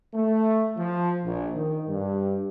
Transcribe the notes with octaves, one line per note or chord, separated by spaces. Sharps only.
A3
F3
A#1
D#3
G2